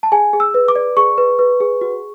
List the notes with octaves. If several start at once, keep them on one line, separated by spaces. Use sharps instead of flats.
A5
G#4 G#5
G#4
E6
B4
D6
D5
G#4 C#6
B4
B4
G#4
F#4